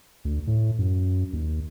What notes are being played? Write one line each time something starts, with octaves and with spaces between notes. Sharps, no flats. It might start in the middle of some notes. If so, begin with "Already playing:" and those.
D2
A2
F#2
D#2